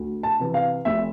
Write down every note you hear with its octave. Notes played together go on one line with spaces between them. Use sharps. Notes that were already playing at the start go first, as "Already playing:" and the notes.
Already playing: D2
A5
C3 E3
F5
F1 E5